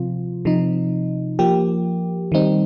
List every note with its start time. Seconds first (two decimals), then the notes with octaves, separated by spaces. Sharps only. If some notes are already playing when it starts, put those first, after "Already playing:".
Already playing: C3 F3 C4 F4
0.45 C3 F3 D#4
1.39 F3 A#3 G4
2.32 D#3 G3 C4 D#4